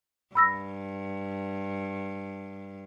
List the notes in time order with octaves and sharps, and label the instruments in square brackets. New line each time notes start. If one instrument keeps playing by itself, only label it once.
[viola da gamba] G2 [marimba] B5 E6 A#6